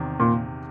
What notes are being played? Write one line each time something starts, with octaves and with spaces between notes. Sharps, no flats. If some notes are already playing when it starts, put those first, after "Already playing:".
Already playing: E2 C3 D#3
A#2